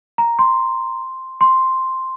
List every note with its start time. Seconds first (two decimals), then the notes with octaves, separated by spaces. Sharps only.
0.18 A#5
0.39 C6
1.41 C6